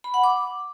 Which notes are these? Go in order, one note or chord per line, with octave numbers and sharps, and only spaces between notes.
B5
F#5
D6